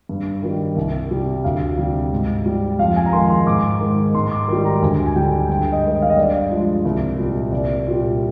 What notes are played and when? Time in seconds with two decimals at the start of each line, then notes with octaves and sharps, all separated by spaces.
0.09 G2
0.43 D#3 G3
0.76 C2
1.10 C3 G3
1.44 D2 F5
1.78 C3 G3
2.12 G#2
2.46 G3
2.79 F2 F5
2.96 G#5
3.06 A#5
3.13 D#3 G#3 C6
3.30 C6
3.47 G#2 D6
3.81 D#3 G#3
4.15 G#2 C6
4.31 D6
4.48 D#3 G3
4.65 A#5
4.82 D2 G#5
5.06 G#5
5.16 D3 G3 G5
5.50 G2 G5
5.72 D#5
5.84 D#3 G#3
5.95 D#5
6.02 F5
6.10 D#5
6.17 G2 D5
6.51 F3 G#3
6.85 C2
7.19 A#2 G3
7.52 C2 D5
7.86 A#2 G3